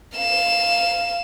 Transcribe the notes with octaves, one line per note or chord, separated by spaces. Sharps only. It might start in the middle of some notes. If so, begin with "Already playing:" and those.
F5 E7